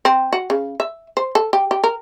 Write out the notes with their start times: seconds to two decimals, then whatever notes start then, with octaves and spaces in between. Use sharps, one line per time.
0.05 C4
0.33 F#4
0.50 C#3
0.80 E5
1.17 C5
1.35 A4
1.53 G4
1.71 G4
1.84 A#4